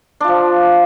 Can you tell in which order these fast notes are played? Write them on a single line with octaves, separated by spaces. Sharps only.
D4 F4 F3